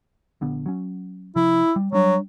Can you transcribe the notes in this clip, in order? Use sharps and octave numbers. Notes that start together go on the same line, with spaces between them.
A#1 D3 B3
F#3 C#4
C3 F3 E4
G3
F#3 G3 D4